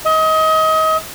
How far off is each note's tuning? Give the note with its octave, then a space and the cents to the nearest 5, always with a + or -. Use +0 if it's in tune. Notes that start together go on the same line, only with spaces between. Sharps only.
D#5 +30